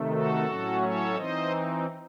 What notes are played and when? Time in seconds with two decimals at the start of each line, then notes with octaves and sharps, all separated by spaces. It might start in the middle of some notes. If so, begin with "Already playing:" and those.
Already playing: C3 D#3 A3
0.10 F#4 A4
0.46 A2 F#3 C#4
0.81 A4 C#5
1.15 E3 C4 D#4 C5 D#5